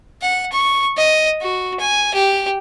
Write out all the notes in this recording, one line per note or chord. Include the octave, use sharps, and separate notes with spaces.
F#5
C#6
D#5
F#4
G#5
G4